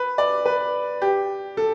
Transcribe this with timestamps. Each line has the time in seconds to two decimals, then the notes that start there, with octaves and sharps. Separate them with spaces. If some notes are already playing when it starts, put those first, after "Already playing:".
Already playing: B4
0.18 D5
0.46 B4
1.02 G4
1.57 A4